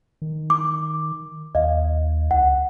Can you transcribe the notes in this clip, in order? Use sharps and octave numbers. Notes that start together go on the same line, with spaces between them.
D#3
D6
D#2 D#5 F5
C#2 F#5